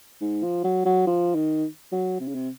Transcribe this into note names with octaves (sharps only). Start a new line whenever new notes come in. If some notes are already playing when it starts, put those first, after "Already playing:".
G#2
F3
F#3
F#3
F3
D#3
F#3
C3
C#3
C3